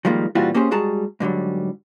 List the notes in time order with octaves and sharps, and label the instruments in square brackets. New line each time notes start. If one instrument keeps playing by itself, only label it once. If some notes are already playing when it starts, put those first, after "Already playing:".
[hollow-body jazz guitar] D#3 F3 G3 G#3 A#3
A#2 E3 G3 C4 F4 F#4
A#3 C#4 G4 G#4 C5
G3 G#3 F#4 G#4 A5 A#5
G#2 D3 F#3 G3